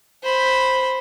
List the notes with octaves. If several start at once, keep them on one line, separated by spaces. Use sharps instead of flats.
C5 B5